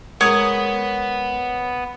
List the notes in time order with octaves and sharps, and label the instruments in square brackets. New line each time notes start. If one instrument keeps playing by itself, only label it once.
[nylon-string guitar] G#3 A#4 [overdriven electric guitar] B3 [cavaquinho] C#5 D#6